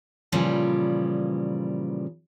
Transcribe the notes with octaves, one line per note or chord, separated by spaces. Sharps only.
A#2 C#3 E3 F3 G3